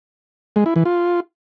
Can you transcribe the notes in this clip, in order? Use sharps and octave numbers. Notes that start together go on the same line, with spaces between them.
G#3
E4
E3
F4